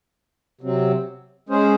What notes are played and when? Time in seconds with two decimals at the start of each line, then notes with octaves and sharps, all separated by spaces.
0.61 C3 F#3 C4
1.49 G#3 C#4 G#4 C5